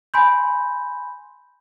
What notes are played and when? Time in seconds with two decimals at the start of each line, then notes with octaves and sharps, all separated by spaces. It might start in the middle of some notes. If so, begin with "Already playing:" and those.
0.14 G#5 B5 C6 G6